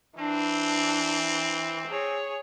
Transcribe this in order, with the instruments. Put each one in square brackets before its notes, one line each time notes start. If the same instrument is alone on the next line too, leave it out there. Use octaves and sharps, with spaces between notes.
[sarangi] E3 [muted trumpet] C4 [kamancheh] D4
[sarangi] G#4 [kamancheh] C#5